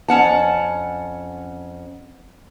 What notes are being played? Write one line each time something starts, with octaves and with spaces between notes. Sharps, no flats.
F2 C#4 F#5 A5